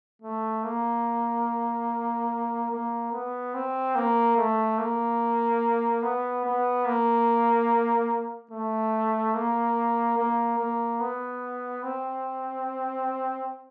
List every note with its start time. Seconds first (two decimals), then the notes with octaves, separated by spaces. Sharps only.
0.22 A3
0.64 A#3
2.71 A#3
3.12 B3
3.54 C4
3.95 A#3
4.37 A3
4.78 A#3
6.03 B3
6.45 B3
6.86 A#3
8.51 A3
9.34 A#3
10.17 A#3
10.58 A#3
11.00 B3
11.83 C4